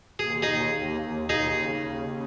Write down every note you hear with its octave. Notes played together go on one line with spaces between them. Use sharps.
D#2 G#4
D#2 D#4 G#4
D#2
D#2
D#2 D#4 G#4
C#3
D#2
C#3